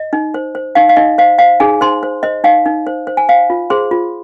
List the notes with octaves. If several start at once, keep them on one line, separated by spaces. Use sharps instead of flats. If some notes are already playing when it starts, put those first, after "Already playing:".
Already playing: D#5
D#4
C5
C5
D#4 F5
F5
D#4 D#5
C5 F5
C5 F5
D#4 G#4 G#5
D#4 C5 C6
C5
C5 D#5
D#4 F5
D#4
C5
C5
G#5
C5 F5
F4
G#4 C5 C6
F4